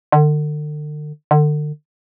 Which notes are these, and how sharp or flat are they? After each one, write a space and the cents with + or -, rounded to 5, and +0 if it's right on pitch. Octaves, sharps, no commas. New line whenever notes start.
D3 +40
D3 +35